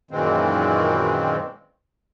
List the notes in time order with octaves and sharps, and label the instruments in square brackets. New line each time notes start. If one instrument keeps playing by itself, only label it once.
[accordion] F#2 A#2 D#3 E3 G#3 C4